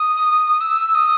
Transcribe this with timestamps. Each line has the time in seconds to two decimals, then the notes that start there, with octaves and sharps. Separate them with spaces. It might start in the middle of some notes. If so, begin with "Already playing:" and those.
Already playing: D#6
0.61 E6
0.95 D#6